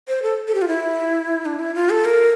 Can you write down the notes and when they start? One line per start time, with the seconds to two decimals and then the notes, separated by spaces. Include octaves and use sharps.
0.08 C5
0.23 A4
0.48 A4
0.54 G4
0.62 F4
0.68 E4
1.45 D4
1.59 E4
1.75 F4
1.90 A4
2.05 A#4